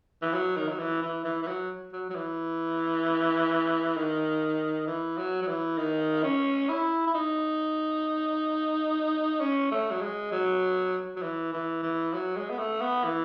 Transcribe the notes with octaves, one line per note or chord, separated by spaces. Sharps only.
E3
F#3
D#3
F#3
E3
E3
E3
E3
F#3
F#3
F#3
E3
D#3
E3
F#3
F#3
E3
D#3
C#4
E4
E4
D#4
C#4
A3
F#3
G#3
F#3
F#3
E3
E3
E3
F#3
G#3
B3
A3
B3
E3